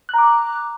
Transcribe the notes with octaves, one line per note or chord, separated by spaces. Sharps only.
A#5 D6 F#6